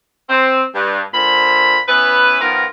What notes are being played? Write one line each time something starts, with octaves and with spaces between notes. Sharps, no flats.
C4
G2
A#2 D3 C5 B5
E3 B3 C#4 B4
D#3 F3 B3 F4 A#4